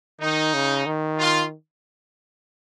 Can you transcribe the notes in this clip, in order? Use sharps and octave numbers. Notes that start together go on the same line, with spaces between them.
D#3 D#4
C#3
D#3
F4